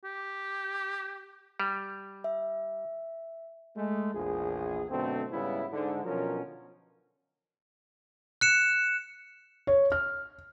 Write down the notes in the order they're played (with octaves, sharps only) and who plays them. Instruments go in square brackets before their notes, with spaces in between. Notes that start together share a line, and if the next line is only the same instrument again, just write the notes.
[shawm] G4
[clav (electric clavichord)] G3
[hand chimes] E5
[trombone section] G#3 A3
A#1 E2 G#4
F#2 B2 D3 A3 C4
G#2 C#3 G3 B3 E4
G#2 D3
B2 D3 F3 F#3 C#4 A#4
[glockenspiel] F#6 C#7 E7
[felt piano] C#5
F6